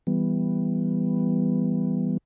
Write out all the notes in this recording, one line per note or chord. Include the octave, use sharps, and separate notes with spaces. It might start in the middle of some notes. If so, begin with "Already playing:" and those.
E3 G3 B3